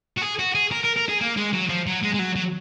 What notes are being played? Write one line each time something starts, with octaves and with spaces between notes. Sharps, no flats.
F#4
G#4
F#4
G#4
A#4
A#4
A#4
G#4
A#3
G#3
F#3
F3
F#3
G#3
G#3
F#3
F#3